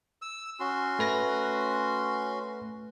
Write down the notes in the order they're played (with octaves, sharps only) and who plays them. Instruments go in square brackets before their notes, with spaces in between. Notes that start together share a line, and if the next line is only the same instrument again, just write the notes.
[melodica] E6
C#4 F#4 C6
[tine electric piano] A3 B4 A#6